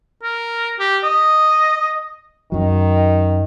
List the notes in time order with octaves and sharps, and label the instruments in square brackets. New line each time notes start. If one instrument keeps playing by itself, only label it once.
[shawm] A#4
G4
D#5
[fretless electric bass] F#2 F#3 [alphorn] D#3